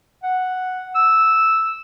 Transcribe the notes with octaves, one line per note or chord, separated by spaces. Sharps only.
F#5
E6